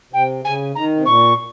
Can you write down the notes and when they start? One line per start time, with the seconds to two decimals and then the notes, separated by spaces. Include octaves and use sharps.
0.13 C3 G5
0.44 C#3 G#5
0.75 D#3 A#5
0.96 C3
1.05 A#2 C#6